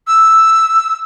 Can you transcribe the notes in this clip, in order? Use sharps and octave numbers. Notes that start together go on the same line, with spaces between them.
E6